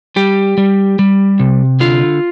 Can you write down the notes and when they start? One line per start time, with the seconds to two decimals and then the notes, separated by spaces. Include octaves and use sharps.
0.16 G3 G4
0.58 G3
0.99 G3
1.40 C3
1.80 D3 F4